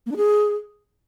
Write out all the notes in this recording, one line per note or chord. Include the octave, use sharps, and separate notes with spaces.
A#3
D4
G#4